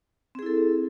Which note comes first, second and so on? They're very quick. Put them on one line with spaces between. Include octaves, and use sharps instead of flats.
C4 G#4 E4 A4